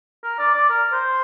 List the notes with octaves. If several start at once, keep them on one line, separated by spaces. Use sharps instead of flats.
A#4
D5
D5
A#4
C5